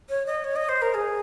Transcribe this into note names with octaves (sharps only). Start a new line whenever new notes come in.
C#5
D#5
C#5
D#5
C5
A#4
G#4